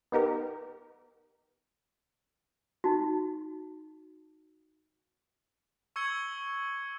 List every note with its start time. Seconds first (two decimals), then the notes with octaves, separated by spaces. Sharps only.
0.12 B3 D#4 G4 A#4
2.84 D#4 F#4
5.96 C#6 E6 G#6 C#7 G7